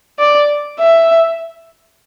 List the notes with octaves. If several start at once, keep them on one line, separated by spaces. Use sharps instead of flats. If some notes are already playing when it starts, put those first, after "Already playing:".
D5
E5